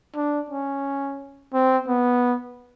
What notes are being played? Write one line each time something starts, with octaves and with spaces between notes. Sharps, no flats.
D4
C#4
C4
B3